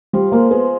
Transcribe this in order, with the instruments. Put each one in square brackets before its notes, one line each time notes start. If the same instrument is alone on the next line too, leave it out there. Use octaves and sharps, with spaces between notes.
[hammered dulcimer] F3 [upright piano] G3
[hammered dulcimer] G#3 [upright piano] A#3
[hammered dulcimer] G#3 [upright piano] B3